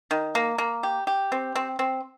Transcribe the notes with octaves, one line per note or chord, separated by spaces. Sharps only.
D#3
A#3
A#3
G4
G4
C4
C4
C4